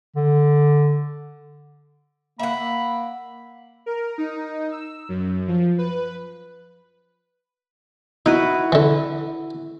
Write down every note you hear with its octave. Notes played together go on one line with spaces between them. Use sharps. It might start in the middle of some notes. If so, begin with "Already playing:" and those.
D3
A#3 E5 F#5 B5
A#3
A#4
D#4
E6
F#2
F3
B4
D#4 E4 F#4 B4
D3 E3